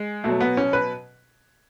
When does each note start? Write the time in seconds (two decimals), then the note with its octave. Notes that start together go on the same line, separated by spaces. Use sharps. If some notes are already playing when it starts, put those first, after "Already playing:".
Already playing: G#3
0.24 B2 F#3 A3
0.41 B3
0.57 C#4
0.73 B4